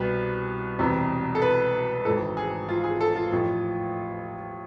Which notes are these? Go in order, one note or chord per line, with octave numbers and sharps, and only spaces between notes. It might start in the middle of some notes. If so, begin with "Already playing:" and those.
Already playing: C2 B2 B4
E1 E2 C3 E3
A4
B4
G#1 G#2 E3 A4
G#4
F4
G#4
A4
F4
A1 A2 F3